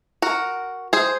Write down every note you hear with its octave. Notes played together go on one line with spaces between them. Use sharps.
F#4 A#4
G#4 C5